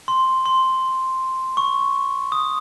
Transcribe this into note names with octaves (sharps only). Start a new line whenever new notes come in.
C6
C6
C#6
D#6